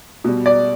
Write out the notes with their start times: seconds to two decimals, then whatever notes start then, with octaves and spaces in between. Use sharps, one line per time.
0.24 B2 G3
0.46 D5